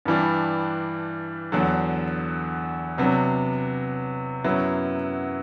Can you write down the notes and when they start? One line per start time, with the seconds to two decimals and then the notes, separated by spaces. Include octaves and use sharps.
0.05 G2 E3 G3 D4
1.52 E2 D3 F#3
2.98 C3 F#3 B3 D4
4.44 F#2 F#3 B3 E4